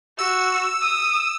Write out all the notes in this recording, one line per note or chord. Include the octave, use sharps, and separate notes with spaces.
F#4 E6
D#6